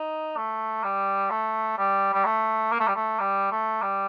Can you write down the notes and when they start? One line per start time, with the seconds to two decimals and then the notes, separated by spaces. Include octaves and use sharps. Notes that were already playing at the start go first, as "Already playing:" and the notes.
Already playing: D#4
0.36 A3
0.84 G3
1.30 A3
1.78 G3
2.13 G3
2.25 A3
2.72 A#3
2.80 A3
2.88 G3
2.95 A3
3.20 G3
3.51 A3
3.82 G3